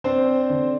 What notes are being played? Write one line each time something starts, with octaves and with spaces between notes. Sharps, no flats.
C4 D4 C5
D3